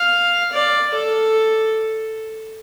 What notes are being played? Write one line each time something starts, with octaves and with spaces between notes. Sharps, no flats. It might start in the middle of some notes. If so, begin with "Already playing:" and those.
Already playing: F5
D5
A4